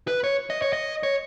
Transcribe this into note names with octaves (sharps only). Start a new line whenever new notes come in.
B4
C#5
D#5
C#5
D#5
C#5